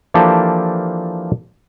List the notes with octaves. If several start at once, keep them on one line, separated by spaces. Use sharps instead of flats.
E3 F3 A#3 D4 G4 A4